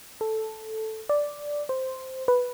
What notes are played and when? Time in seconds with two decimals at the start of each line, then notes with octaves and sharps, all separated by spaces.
0.21 A4
1.09 D5
1.69 C5
2.28 B4